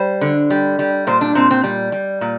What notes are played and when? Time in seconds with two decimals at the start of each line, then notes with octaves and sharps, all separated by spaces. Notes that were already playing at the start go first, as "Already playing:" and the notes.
Already playing: G3 C5
0.21 D3
0.50 G3
0.79 G3
1.07 A#2 C5
1.21 D4
1.35 A#2 C4
1.50 C4
1.64 G3
1.92 G3
2.21 A#2